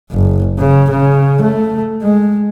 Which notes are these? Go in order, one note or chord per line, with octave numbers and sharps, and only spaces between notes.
F#1
C#3
C#3
A3
G#3